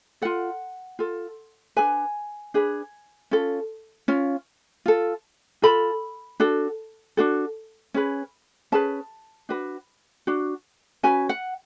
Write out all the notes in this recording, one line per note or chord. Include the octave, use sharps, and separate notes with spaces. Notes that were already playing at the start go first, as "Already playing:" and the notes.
F4 A4 F#5
F4 A4
D4 G#4 B4 G#5
D4 G#4 B4
C#4 F4 A4
C#4 F4
F4 A4
F4 A4 B5
D4 F#4 A4
D4 F#4 A4
C#4 G#4 B4
C#4 G#4 B4 A5
D4 F#4 B4
D4 F#4
C#4 F#4 B4 G#5
F#5